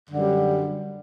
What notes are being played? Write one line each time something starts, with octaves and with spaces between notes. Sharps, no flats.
F#2 D3 G3